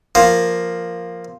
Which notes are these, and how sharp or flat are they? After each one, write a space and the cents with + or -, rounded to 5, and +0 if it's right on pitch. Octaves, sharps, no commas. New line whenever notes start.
F3 +0 A#3 +0